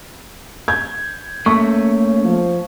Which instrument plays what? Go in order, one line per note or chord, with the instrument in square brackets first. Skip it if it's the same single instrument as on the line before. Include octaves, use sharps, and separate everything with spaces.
[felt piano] G6 G#6
[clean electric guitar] A3 A#3 E5 [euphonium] C#4 [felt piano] C#6
[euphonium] F3